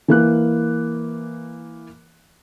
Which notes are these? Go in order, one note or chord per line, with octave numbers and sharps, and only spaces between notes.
E3 A#3 F#6